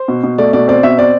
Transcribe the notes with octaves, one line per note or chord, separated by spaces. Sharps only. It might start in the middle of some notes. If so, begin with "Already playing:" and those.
Already playing: C5
B2
B2
A3 D5
B2 D5
C4 D5
B2 E5
C4 D5